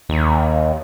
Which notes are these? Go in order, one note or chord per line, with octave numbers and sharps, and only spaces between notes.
D#2